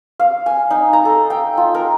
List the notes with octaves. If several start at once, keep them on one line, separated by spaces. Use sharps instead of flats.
F5
G#5
D#4
A#5
A4
G5
F4
A#4